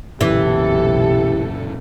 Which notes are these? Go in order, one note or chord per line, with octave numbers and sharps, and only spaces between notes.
B1 F#2 A#2 C#3 E3 G4 A4